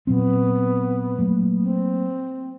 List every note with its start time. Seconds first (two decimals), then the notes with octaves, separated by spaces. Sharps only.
0.07 A#2 F#3 B3 C4
1.19 F#3 A3 A#3
1.62 C4